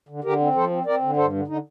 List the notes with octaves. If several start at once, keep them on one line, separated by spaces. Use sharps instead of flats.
D3
D3 G4 A#4
C4
F3 A4 C5
C4
C4 A#4 D5
D3
G2 A4 C5
D3
D3 D#4